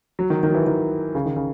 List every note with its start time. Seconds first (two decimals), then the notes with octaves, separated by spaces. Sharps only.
0.19 F#3
0.30 D#3
0.43 D#3
0.50 F#3
0.54 E3
0.67 D#3
1.15 C#3
1.25 D#3
1.36 C#3